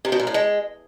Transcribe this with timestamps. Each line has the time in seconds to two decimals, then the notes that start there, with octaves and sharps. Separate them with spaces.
0.05 C3
0.12 B2
0.20 A#2
0.27 A2
0.34 G#3